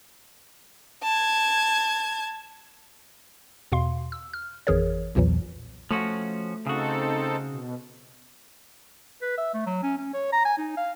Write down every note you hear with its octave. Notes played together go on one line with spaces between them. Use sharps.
A5 G#6
E2 B2 F5 C6
E6
F6
G#1 F2 E3 G#4 A#4 C#5
B1 E2 A#2 E3 F#3
F3 A3 C#4 F#4
C#3 C4 D#4 F#4 A4
B2
B4
E5
A3
F#3
C#4
C#4
C#5
A#5
G#5
D#4
F5